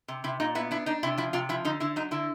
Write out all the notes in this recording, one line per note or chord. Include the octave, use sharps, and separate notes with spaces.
C3
C3 E4
A#2 D#4
B3 E4
D4 E4
D4 D#4
C3 E4
F3 E4
C3 F4
F3 E4
D3 D#4
D3 E4
F#3 D#4
D3 E4